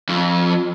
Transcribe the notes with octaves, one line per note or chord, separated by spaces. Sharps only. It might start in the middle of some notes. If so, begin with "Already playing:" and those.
F2